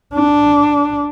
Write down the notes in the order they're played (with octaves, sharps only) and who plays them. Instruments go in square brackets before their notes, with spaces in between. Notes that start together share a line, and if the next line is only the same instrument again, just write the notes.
[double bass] D4